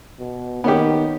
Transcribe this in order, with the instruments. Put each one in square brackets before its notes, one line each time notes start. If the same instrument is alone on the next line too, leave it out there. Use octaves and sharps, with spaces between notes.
[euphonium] B2
[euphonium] D#3 [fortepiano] B3 C#4 G4